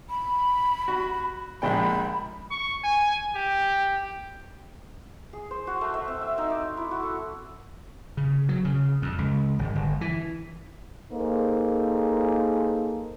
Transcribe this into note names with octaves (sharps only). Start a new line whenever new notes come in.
B5
F#4
A#1 G#3 G5 B5
C#6
G#5
G4
G#4
C5
F#4
A3
E5
C4
E5
D#4
D5
E4
F#4
A4
C#3
F#3
C#3
F2
C#2
G#1
G1
E3
A#3 D#4 G#4 A4 C5